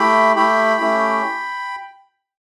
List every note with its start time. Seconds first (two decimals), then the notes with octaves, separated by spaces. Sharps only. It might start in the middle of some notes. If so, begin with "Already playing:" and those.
Already playing: A3 E4 G4 G5 B5
0.36 A3 E4 G4 G5 B5
0.81 A3 C#4 E4 G4